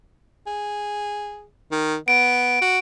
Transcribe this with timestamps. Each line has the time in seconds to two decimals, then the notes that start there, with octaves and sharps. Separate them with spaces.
0.47 G#4
1.72 D#3
2.08 B3 D7
2.62 F#4